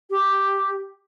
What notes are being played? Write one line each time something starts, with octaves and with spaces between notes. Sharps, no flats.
G4